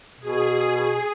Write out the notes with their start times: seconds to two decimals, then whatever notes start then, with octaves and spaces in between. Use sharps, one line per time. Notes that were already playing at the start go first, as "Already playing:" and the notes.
0.20 B2 G#4